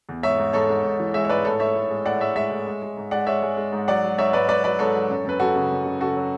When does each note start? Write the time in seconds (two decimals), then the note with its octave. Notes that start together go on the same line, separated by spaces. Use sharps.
0.09 E2
0.23 G#2 C#5 E5
0.38 G#2
0.53 G#2 A4 C#5
0.69 G#2
0.84 G#2
0.99 E3
1.14 G#3 C#5 E5
1.25 C#5
1.29 G#2 B4 D5
1.45 A2 A4 C#5
1.60 A2 C#5 E5
1.75 A2
1.90 G#3
2.05 A2 D5 F#5
2.20 G#3 C#5 E5
2.36 G#3 C#5 E5
2.51 A2
2.67 G#3
2.82 G#3
2.97 G#2
3.11 G#3 D5 F#5
3.27 G#3 C#5 E5
3.43 G#3
3.57 G#3
3.73 G#2
3.88 F#3 D5 F#5
4.03 F#3
4.18 G#2 C#5 E5
4.33 G#2 B4 D5
4.48 G#2 B4 D5
4.64 F#3 B4 D5
4.79 G#2 A4 C#5
4.94 F#3
5.09 F#2
5.25 F#2 B4
5.39 F#2 F#4 A4
5.56 C#3
5.71 F#2
5.86 C#3
6.01 C#3 F#4 A4
6.16 F#3